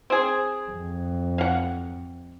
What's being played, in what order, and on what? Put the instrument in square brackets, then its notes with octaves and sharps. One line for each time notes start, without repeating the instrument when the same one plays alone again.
[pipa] C4 G#4
[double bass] F2
[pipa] F5 F#5